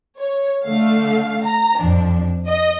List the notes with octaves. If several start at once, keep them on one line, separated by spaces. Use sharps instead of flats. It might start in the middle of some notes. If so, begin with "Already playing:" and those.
C#5
D3 A3 F5
A#5
F2 F3 D4
D#5